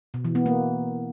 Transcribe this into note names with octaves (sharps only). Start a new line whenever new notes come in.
B2
E3
B3
A#3